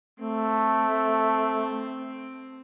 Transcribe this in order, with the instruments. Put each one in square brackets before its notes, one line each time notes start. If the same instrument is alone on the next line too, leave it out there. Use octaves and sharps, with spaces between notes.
[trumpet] A3 [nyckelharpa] C4